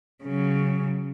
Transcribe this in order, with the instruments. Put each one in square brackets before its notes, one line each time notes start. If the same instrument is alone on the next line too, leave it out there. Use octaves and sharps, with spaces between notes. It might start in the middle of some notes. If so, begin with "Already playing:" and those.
[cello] C#3 F#3